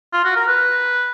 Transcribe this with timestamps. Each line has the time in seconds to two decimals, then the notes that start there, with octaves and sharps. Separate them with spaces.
0.13 F4
0.24 F#4
0.36 A#4
0.48 B4